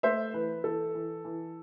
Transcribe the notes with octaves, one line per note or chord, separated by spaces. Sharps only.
A3 C5 E5
E3 B4
E3 A4
E3
E3